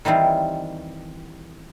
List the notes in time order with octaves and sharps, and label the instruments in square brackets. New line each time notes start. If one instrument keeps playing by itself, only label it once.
[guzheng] D#3 E3 G3 C4 F4